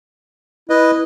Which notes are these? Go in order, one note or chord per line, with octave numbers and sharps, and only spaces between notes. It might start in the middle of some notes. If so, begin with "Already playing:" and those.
E4 B4 D#5